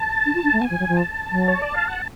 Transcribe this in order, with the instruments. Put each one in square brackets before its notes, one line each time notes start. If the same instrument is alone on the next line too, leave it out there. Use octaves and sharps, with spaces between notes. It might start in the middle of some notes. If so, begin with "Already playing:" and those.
Already playing: [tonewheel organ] A5
[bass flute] D4
F4
D4
A3
[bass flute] B3 [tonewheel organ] G#5
[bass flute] F3
F#3
F3
[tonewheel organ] A5
[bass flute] F#3
[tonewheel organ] C#5
D5
F5
F#5